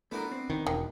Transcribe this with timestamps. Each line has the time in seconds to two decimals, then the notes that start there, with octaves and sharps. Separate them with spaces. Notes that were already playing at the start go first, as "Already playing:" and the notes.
0.11 A3 B3 D4 E4 A#4 B4
0.31 C4
0.50 D#3
0.67 E1 D#3